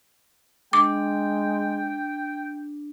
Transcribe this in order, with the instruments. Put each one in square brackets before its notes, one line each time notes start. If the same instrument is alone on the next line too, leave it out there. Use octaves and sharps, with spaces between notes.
[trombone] G#3 [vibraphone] D4 [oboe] G5 [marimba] D6